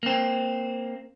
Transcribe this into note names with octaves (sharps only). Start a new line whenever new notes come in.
A#3 C4